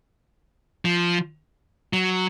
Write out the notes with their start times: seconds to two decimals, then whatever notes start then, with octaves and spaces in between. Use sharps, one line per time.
0.85 F3
1.93 F#3